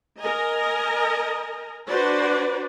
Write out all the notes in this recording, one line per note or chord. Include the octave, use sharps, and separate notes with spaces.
A#4 D#5 G#5 A#5
D4 F#4 B4 C5 D5